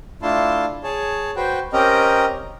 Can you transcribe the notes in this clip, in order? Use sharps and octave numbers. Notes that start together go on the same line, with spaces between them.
A3 D4 E4 F4 A5 C6
G#4 C#5 A5
F#4 B4 C5 G5
C4 C#4 G4 A#4 D#5 A#5